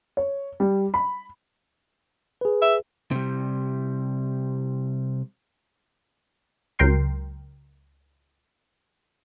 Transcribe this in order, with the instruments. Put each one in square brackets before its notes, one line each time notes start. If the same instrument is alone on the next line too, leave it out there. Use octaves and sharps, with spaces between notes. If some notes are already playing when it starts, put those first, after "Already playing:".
[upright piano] C#5
G3
B5
[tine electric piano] G#4 B4
[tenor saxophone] E5
[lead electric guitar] C3 G3
[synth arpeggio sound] C#2 F#3 A#4 G5 C6 C7